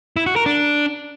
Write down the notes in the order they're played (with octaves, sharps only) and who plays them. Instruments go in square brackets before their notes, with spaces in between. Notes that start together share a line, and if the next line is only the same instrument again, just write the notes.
[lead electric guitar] E4
F#4
A#4
D4